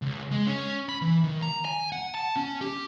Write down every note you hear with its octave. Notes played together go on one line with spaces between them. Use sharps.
C#2
G#3
C#4
B5
E3
D#3
A#5
G#5
F#5
A5
C#4
G4